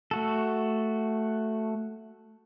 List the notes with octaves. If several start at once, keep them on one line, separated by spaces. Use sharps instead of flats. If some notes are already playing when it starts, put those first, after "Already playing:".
A3 F#4 A4